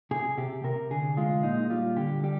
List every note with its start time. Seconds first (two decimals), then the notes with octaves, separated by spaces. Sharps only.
0.11 C3 G#4
0.37 C3 G4
0.64 C3 A#4
0.91 D3 G#4
1.17 G#3 F4
1.43 A#2 D#4
1.70 G3 F4
1.96 D3 G4
2.24 G3 G4